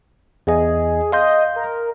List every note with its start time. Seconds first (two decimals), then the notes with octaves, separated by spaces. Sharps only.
0.47 E2 G#4 D#5
1.12 D#5 F5 C6 G6
1.56 A#4